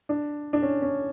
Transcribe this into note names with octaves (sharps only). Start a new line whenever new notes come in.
D4
D4
C#4
C#4